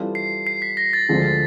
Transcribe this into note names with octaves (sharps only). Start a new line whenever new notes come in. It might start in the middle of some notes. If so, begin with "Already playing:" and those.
Already playing: E3 G3 C4 F4 A4
C7
C7
B6
A#6
A6
D2 D3 F3 G#3 C4